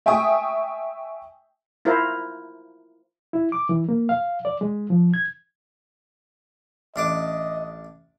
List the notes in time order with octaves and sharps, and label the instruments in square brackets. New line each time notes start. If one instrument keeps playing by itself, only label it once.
[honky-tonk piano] E5 G5 G#5 C#6 D#6
[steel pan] E4 F4 A#4 C5
[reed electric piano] E4
D6
E3
A#3
F5
D5
G#3
F3
G#6
[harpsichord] A1 D4 D6 [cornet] D#5